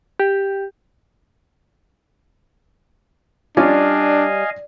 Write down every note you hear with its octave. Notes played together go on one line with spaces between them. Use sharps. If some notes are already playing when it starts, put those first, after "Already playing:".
G4
G3 C#4 D4 F4 D5 D#5 F5 G#5